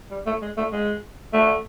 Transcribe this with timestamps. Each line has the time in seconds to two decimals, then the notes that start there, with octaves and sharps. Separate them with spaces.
0.11 G3
0.26 A3
0.42 G#3
0.57 A3
0.73 G#3
1.34 A3